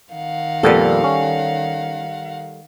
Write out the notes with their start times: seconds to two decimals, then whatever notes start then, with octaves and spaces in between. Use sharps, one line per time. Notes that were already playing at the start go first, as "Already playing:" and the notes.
0.11 D#3 F5 F#5
0.63 F2 A#2 G3 B3 G4 A4
1.04 C#4